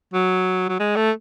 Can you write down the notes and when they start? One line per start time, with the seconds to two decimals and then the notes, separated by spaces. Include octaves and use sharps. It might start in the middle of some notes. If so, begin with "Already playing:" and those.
0.13 F#3
0.69 F#3
0.80 G#3
0.96 A3